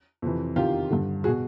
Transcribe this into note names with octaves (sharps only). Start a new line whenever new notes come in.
F2 C3 E3
E2 C3 D#3 F4 G4
G2 D3
F#4 G#4
B2